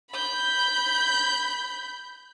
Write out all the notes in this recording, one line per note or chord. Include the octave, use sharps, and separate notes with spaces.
B5 G6